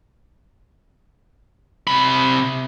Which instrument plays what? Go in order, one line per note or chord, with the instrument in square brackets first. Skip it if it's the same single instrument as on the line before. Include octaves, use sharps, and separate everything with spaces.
[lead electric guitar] C3 B5